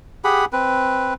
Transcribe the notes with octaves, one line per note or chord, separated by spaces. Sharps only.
G4 G#4 F#5 B5
C4 B4